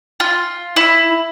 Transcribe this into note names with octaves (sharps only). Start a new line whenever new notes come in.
F4
E4